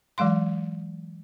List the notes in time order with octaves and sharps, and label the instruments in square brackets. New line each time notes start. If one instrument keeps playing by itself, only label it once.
[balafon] E3 F#3 G#3 F5 C6